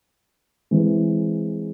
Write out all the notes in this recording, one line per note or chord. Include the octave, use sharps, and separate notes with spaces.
E3 G#3 C4